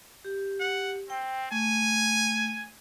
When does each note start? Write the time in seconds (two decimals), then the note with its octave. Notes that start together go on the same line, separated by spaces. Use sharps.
0.25 G4
0.60 F#5
1.10 C4 G5
1.51 A3 G#5